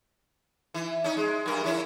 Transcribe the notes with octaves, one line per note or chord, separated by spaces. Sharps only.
E3
C#4 D#4
G#3
G2 A#4
E3 C#4 E4